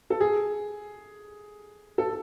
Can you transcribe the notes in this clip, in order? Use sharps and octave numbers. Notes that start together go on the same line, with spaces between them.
A4
G#4
A4